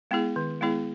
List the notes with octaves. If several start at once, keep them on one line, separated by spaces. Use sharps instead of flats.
G#3 B3 E4 G#4
D#3
G#3 B3 E4 G#4